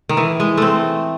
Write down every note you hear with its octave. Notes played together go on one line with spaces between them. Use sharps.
D#3
E3
G#3
A3 C4